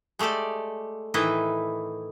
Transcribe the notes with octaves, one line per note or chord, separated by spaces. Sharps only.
G#3 A3 G4 A4 D5
A2 D#3 E3 E4 B4 D#5